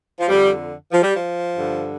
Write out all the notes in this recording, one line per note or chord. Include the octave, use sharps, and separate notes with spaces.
F3
F2 D3 G3
F3
G3
F3
G2 D3